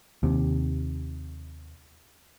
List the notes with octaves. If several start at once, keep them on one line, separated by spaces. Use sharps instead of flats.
D#2 C3